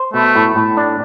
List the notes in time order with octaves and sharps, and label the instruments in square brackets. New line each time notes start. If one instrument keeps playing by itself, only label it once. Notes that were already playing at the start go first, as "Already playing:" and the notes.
Already playing: [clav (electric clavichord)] C5
[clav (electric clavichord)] B2 [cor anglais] A3
[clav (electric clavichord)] A2
A2
D4